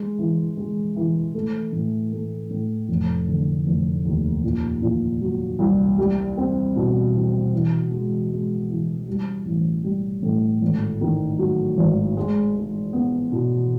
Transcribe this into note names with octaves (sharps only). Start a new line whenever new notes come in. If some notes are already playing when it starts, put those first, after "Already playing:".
Already playing: G#3
E3
G#3
E3
A3
A2
A3
A2
F1
D3
F1
D#2
A#2
A#2
F#3
C2
G3
C4
B2
B2
E3
G#3
G#3
E3
G3
A1
G3
A2
G#1
D#3
F#3
G#1
G#3
G#3
B3
B2